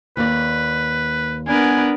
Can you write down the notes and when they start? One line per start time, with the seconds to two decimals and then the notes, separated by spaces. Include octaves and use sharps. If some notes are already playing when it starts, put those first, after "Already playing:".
0.17 D#2 B4 D5
1.47 B3 D4 A#4 B4 G#5